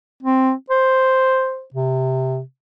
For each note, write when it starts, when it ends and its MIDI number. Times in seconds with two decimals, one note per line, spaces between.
0.23 0.52 60
0.70 1.64 72
1.74 2.40 48